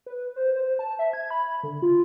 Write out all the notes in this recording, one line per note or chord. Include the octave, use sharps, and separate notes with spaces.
B4
C5
C5
A5
E5
G#6
B5
D3
F4